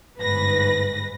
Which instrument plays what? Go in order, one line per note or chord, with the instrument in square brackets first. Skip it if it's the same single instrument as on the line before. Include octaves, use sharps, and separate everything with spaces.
[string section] G1 G#2 B4 A#6